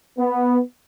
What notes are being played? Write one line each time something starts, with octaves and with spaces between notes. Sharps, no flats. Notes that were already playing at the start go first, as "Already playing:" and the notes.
B3